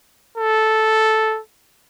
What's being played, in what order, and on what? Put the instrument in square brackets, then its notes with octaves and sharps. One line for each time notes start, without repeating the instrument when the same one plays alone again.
[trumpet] A4